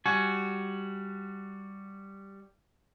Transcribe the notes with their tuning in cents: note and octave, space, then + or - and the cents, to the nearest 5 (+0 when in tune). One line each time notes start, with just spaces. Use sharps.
G3 +0 F#4 +0 G#5 +20